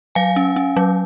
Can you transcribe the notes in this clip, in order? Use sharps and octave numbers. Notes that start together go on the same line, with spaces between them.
F#3 F5 G#5
C#4
C#4
F#3